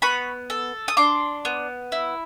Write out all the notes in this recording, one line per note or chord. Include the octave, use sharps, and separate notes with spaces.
B3 B5 C#6
A4
D#6
D4 C6 D6
B3
E4